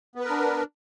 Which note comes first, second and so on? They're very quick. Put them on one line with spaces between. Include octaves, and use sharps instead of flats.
B3 B4 A#4 D4